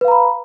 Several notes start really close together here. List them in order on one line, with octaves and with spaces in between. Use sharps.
B4 F5 A#5 B5